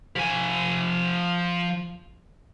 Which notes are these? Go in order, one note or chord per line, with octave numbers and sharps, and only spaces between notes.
F3 G#5